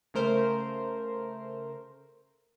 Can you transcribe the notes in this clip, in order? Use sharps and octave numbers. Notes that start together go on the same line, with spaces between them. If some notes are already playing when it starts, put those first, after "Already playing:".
C#3 A3 A#4 C5